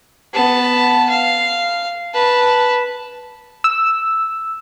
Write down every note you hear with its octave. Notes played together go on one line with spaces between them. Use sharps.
B3 A5
F5
B4 A5
E6